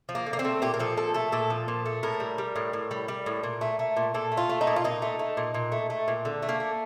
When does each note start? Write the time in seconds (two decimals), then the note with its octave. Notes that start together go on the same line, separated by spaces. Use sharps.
0.09 F3
0.15 A#3
0.26 D3
0.33 A#3
0.39 C4
0.45 A3
0.62 A#2 G4
0.74 A#4
0.79 F3 A4
0.97 A#2 A4
1.14 A3 A4
1.32 A#2 A4
1.50 F3
1.68 A#2
1.86 A3
2.03 A2 A#4
2.20 G3
2.38 G3
2.56 A2
2.73 A2
2.91 G3
3.08 G3
3.26 A2
3.43 A#2
3.61 A3
3.79 A3
3.97 A#2
4.14 A#2 A4
4.32 A3
4.37 F4
4.49 A3
4.61 D#4
4.67 A#2
4.76 F4
4.84 A#2 D#4
5.02 A3
5.19 A3
5.37 A#2
5.54 A#2
5.72 A3
5.90 A3
6.08 A#2
6.25 D3
6.42 A3
6.49 A#3
6.60 A3